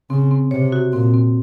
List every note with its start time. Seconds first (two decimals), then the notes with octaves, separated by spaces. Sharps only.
0.10 C#3 C4
0.31 C4
0.51 C3 C#5
0.72 F#4
0.93 A#2 C4
1.14 C4